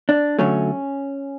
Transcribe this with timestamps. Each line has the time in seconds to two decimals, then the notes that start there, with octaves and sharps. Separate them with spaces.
0.09 D4
0.39 D3 F#3 A3 C#4